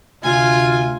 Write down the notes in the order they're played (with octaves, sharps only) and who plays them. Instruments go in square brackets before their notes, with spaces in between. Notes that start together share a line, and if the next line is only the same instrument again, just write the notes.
[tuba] D2 [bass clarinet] C3 [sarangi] F4 [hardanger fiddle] G#5